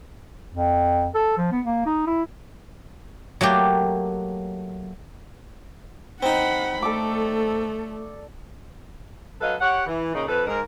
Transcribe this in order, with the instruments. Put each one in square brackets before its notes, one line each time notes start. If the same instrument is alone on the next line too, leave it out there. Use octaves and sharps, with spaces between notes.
[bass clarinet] F2
A4
F3
B3
A#3
D#4
E4
[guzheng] F#3 A3 A#3 G4
[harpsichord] C4 D#4 [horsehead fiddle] F#5 B5
[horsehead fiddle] A3 [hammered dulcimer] A4 D5 D6
[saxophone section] F#3 A4 B4 D#5 F5
G4 C#5 F#5
E3
A#2 C#3 D#4
F2 A4 B4
G#2 A#4